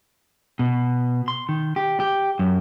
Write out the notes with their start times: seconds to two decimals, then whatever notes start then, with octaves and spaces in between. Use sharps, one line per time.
0.59 B2
1.28 C6
1.49 D#3
1.76 G4
2.00 G4
2.39 F#2